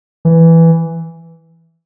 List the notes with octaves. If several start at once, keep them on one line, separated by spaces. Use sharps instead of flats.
E3